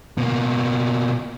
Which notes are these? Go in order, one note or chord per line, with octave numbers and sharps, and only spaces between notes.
B2 A#3